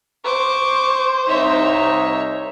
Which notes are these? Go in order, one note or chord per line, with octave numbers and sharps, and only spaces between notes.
C5 C#6 D6
C2 D#4 C#5 E5